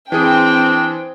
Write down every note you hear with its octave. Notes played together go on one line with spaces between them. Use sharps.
E3 C4 D4 G#4 G5 D#6